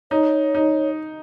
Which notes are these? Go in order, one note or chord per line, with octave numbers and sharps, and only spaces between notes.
D#4 C#5
D#4